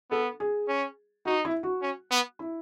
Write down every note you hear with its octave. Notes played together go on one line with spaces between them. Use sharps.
B3 A4
G#4
C#4
D#4 F#4
E4
F#4
C#4
B3
E4